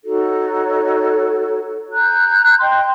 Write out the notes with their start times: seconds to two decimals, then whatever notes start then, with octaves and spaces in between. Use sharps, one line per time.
0.05 D#4 F#4 A4 C#5
1.93 A#5 F#6 G6
2.60 D#5 G5 C6